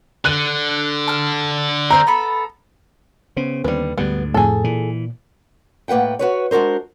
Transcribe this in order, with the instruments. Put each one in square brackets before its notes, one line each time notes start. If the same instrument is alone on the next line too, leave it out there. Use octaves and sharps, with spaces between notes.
[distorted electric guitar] D3 [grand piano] F#6 D#7
[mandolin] A5 F6
[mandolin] C4 C5 F6 [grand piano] A#5
[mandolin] B3 A4 B5
[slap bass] C#3 [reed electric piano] B3 C#4 C5
[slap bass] D#2 D3 [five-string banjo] G3 B4
[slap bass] D2 G#2 D3 [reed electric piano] G3 [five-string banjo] B3
[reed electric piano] F2 A2 [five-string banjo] G#4 A4
[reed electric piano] A#2 [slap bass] E3
[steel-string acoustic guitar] A2 A#3 B4 F#5 G5
F#4 B4 C#5
G#3 D4 F#4 A#4 C5